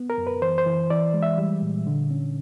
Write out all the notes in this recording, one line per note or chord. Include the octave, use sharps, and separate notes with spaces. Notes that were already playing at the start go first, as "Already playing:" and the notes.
Already playing: B3
A#4
F#2
B4
E3 C5
C5
E3
E3 D5
G#3
E5
G3
A#2
D3
C#4